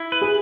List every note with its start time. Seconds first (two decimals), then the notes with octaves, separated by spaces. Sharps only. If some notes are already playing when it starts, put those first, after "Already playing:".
Already playing: E4
0.12 B4
0.21 G#4